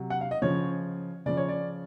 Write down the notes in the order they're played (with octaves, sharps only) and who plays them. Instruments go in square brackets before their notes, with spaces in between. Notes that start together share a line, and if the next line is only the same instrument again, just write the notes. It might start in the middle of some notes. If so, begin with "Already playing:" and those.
Already playing: [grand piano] C3 F#3
F#5
F5
D#5
C#3 F3 C#5
C#3 F3 D5
C#5
D5